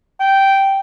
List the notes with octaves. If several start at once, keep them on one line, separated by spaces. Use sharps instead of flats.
G5